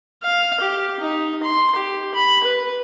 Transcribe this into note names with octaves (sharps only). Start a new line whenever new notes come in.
F5
G4
D#4
C6
G4
B5
B4